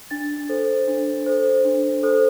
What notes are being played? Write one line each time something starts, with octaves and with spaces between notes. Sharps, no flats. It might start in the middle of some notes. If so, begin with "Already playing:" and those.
D4 A6
A4 C5
D4
A4 C5
D4
A4 C5